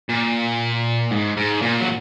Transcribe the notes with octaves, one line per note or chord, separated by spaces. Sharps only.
A#2
G#2
G#2
A#2
F#3